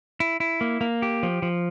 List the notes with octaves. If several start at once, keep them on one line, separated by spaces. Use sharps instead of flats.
E4
E4
A#3
A#3
G4
F3
F3